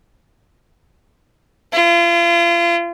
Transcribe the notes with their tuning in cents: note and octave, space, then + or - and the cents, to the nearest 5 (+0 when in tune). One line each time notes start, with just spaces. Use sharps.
F4 -35